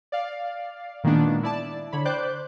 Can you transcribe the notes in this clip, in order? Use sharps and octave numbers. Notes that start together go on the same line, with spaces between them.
D5 F5
A#2 D#3 G#3 A#3 B3 D4
E4 D5 A5
D3 C#5 B5
C5 D5 G5 D6 F#6 G6